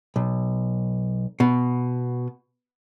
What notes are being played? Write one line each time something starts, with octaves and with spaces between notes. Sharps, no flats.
B1
B2